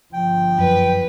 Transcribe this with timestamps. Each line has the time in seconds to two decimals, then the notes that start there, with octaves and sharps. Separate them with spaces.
0.13 G1 F3 G5
0.58 F#2 B4